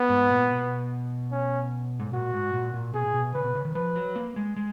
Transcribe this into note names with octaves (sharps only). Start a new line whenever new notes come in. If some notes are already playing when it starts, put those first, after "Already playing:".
Already playing: B3
G#2
A#2
B2
C#4
G#2
A#2 F#4
G#2
A#2
A#2
B2 G#4
A#2
B2
C#3 B4
B2
C#3
D#3
F3 B4
F#3
A#3
G#3
G#3